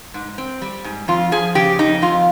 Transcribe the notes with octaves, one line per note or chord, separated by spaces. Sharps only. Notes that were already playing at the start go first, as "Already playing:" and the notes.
G#2
C4
G3
G#2
F2 F4
F3 G#4
C#3 G4
F2 D#4
F2 F4